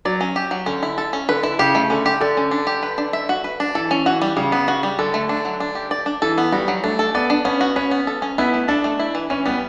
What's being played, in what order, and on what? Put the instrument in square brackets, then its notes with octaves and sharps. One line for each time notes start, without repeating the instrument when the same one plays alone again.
[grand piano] F#3 [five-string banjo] D5
[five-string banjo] C#4
G4
F#3
[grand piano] D3 [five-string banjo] C#4
[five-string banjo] E4
A4
C#4
[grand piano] D3 [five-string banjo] B4
[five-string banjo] E4
[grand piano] C#3 [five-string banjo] G4
[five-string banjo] A3
[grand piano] D3 [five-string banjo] C#4
[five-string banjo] G4
[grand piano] D3 [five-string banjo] D5
[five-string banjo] C#4
D4
G4
B4
D4
E5
F#4
B4
D4
[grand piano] E3 [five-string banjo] A4
[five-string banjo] C#4
[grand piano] E3 [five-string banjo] F#4
[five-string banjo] G3
[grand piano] C#3 [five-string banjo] G3
[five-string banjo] B3
F#4
G3
[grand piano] D3 [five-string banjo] A4
[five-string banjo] A3
D4
F#3
D4
G4
D5
D4
[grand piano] E3 [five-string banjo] A4
[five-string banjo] B3
[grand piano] G3 [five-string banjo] F#4
[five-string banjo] F#3
[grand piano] A3 [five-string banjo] D4
[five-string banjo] A4
[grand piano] B3 [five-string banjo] D5
[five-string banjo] D4
[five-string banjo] B3 [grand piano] C#4
[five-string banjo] F#4
[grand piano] C#4 [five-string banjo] B4
[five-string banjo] B3
A4
C#4
[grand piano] B3 [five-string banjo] E4
[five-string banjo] A3
[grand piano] D4 [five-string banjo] A4
[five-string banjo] A3
E4
E3
[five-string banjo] E3 [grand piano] C#4
[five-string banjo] G3 [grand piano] B3